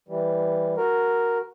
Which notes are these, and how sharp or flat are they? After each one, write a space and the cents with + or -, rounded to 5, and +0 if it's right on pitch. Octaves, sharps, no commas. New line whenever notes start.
E3 +0 G3 +0
F#4 -5 A#4 +0